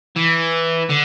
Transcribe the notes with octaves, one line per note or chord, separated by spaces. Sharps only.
E3
D3